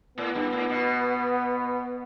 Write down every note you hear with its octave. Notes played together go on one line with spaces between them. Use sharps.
A2 B3
G2
A2
B2